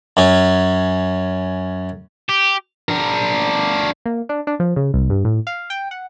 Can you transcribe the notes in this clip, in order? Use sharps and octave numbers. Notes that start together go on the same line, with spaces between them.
F#2 C#4
G4
D4 A#4
A#3
D4
D4
F3
C#3
C2
G2
A2
F5
G5
F#5